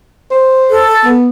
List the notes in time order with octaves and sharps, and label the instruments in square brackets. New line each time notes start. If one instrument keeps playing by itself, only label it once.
[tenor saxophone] C5
[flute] A4
[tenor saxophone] B3